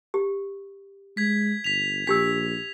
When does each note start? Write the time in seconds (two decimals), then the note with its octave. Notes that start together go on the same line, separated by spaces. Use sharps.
0.14 G4
1.17 G#3 G#6 B6
1.64 G1 B6 F7
2.07 A#1 D4 G4 E6 B6